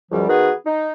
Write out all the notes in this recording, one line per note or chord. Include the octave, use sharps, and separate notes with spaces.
C#2 F#2 F3 G3
D#3 B3 F#4 G#4 B4
D#4